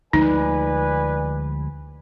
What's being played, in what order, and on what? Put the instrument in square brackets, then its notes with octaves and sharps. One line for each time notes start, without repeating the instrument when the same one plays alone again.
[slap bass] D2 F3 G#3 [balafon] D#4 [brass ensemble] B4 D5 G#5